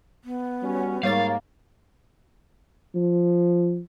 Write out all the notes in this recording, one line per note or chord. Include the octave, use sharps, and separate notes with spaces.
B3
G3 C#4 F#4
G#2 G3 A#3 C#5 F5 A6
F3